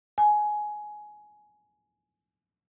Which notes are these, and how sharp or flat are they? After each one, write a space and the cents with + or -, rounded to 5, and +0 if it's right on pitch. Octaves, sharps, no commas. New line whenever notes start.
G#5 +15